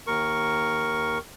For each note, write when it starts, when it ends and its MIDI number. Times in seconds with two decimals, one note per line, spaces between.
0.07 1.18 39
0.07 1.18 70
0.07 1.18 85